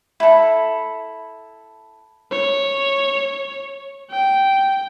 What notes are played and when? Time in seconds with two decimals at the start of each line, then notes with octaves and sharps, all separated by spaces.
0.20 E4 A4
2.31 C#5
4.10 G5